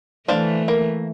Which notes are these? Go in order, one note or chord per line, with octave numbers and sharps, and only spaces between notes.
E3 A3 D4 C5 F5
A#3